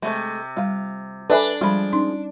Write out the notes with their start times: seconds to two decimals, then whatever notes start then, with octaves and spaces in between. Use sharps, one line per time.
0.02 C3 G#3 A3
0.57 G3 F4 F5
1.30 D4 A4 B4 E5 G#5 B5
1.61 F3 G3 G#3 F4 B5
1.92 C#4 D#4 C6